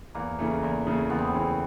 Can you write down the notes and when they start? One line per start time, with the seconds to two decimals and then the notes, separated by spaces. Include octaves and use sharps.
0.14 E2 A#3
0.39 C#3 E3 A3
0.63 E2
0.87 C#3 E3 A3
1.10 E2 B3
1.19 C4
1.28 B3
1.34 C#3 E3 A3